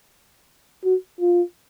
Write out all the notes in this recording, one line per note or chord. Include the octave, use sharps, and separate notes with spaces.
F#4
F4